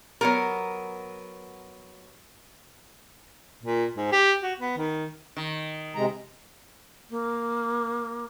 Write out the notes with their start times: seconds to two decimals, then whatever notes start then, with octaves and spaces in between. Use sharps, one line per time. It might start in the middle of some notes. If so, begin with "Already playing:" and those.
0.21 F#3 B3 A#4
3.63 A#2
3.97 G#2
4.12 G4
4.43 F#4
4.59 B3
4.77 D#3
5.37 D#3
5.95 C3 G#3 A#5
7.10 A#3